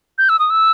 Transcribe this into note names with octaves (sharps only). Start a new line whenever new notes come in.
G6
E6
D#6
E6